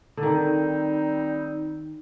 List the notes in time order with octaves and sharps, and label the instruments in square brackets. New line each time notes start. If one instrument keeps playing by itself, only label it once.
[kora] D3
[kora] D#3 [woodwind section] G3 C4 D#4